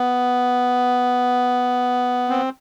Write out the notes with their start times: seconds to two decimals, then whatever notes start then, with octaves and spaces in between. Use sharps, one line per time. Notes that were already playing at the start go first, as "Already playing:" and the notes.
Already playing: B3
2.29 C4